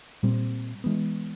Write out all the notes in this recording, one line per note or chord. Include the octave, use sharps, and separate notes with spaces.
A#2 G3 C4
E3 G#3 B3